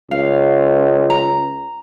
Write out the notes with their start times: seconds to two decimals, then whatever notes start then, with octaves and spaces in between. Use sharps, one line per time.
0.11 C#2 F5
1.10 A#5